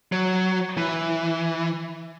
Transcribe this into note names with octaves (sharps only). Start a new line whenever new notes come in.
F#3
E3